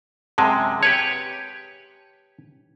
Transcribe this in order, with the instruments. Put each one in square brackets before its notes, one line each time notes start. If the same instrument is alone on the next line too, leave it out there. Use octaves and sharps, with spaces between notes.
[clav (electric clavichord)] F#2 C3 G#3 [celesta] A5
[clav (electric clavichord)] G4 B4 C#5 [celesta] G#6